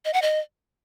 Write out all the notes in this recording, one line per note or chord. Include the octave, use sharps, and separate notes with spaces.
D#5
F#5
D#5